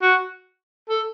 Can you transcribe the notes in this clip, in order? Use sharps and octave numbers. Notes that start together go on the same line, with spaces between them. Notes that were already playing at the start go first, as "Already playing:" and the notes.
F#4
A4